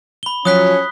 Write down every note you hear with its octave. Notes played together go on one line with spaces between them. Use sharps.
B5 G7
F3 F#3 C#4 C#5 D#6 F#6 B6